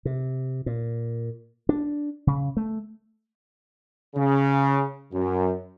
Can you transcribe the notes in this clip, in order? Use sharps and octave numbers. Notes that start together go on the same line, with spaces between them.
C3
A#2
D4
C#3
A3
C#3
F#2